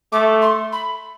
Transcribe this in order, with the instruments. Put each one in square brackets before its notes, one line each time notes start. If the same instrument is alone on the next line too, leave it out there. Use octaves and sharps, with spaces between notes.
[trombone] A3 [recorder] D6
[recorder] C6
B5